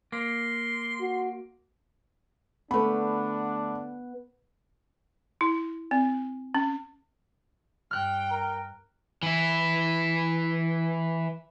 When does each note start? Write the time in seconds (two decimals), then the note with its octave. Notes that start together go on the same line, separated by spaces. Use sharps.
0.12 A#3 C6
1.01 F#4
2.71 D3 A3 B3 D4 B4 B5
5.41 E4
5.91 C4
6.55 C#4
7.91 G2 G5 F6 F#6
8.31 A#4
9.23 E3 E4